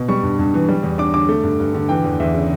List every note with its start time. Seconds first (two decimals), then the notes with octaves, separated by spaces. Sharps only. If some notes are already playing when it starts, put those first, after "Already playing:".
Already playing: B2
0.08 G3 C#6
0.23 G2
0.39 G2
0.54 E3
0.69 G3
0.83 E2
0.98 D4 D6
1.14 D3 D6
1.29 A3
1.43 G2
1.60 G2
1.74 D3
1.89 E3 G5
2.04 E2
2.20 E2 E5
2.35 C#3